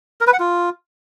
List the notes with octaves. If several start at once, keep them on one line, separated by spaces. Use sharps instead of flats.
A#4
B4
F#5
F4